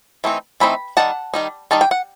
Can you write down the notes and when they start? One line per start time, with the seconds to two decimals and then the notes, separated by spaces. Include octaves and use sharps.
0.24 E3 A3 C4 D#4
0.60 E3 A3 C4 D#4 B5
0.97 D#3 G3 D#4 F#5 A5
1.34 D#3 G3 D#4
1.71 D#3 G3 D#4 A5
1.81 G5
1.91 F#5